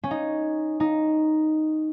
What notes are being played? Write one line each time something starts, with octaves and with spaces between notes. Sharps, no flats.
C#4
D#4
D#4